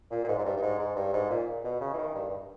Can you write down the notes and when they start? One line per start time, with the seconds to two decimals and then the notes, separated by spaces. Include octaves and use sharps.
0.11 A#2
0.24 A#2
0.28 G#2
0.38 G#2
0.45 G2
0.56 G2
0.62 G#2
0.79 G#2
0.96 G2
1.13 G#2
1.30 A#2
1.64 B2
1.81 C#3
1.94 E3
1.98 D#3
2.15 G2
2.28 G2